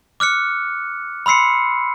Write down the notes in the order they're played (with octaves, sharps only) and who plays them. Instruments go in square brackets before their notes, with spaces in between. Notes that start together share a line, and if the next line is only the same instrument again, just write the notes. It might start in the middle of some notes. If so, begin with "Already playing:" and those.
[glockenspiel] D6 F6 F#6 C#7
B5 C6 E6 C7 C#7